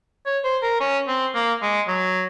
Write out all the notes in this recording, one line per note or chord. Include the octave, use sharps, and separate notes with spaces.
C#5
C5
A#4
C#4
C4
A#3
G#3
F#3